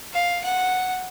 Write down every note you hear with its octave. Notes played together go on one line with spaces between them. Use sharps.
F5
F#5